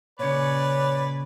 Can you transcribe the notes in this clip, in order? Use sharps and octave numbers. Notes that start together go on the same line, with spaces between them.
A#2 C#3 B4 C#5 D5